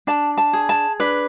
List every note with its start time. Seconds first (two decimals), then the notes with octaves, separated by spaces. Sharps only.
0.07 D4 A5
0.37 A5
0.53 G#4
0.69 A5
1.00 D4 B4